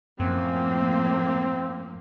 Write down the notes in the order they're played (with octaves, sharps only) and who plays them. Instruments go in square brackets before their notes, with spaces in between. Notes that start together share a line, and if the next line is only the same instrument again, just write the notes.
[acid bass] F#2 [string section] A2 F3 A#3 [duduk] C4